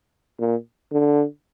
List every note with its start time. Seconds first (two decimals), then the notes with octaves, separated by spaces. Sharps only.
0.39 A#2
0.92 D3